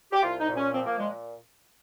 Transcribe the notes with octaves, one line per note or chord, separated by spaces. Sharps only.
G4
C2 F4
D#4
A#2
C#4
F3 C4
A#3
A#2 G#3